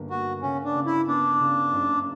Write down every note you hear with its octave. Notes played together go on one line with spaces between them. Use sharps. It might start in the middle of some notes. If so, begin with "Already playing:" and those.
Already playing: G1 A#3
A#3 F#4
C#3 C#4
D4
C#3
E4
B3 D4
C#3
F#1